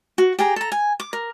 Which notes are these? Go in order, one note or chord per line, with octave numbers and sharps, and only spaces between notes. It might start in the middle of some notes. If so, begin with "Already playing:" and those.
F#4
G4 G#4 A#5
A4 A#5
G#5
D6
A#4